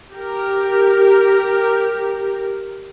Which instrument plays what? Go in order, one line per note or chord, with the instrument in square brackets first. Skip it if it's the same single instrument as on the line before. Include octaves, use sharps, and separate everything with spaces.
[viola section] G4 A#4